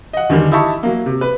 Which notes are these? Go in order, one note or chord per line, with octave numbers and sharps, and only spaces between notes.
D#5 F#5
E2 D3 D#3 G3
D#4 E4 G4 E5 A5 C#6
F#3 A#3
C3
B4